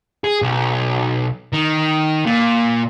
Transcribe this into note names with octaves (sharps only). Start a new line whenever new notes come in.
G#4
B1
D#3
A#2